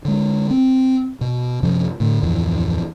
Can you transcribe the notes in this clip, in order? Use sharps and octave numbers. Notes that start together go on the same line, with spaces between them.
D3 G#3
C4
B2
F#2 C3 F3 C#4
A2 D3 A3
D1 F2 E3